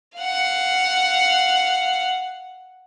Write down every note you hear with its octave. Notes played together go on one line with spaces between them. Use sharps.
F5 F#5